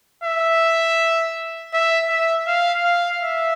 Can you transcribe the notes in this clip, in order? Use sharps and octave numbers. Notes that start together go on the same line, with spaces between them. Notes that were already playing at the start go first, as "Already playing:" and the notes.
E5
E5
E5
F5
F5
E5